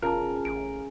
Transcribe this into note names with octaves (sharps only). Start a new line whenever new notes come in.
E1 C#3 F4 A#4 A5
A1 D7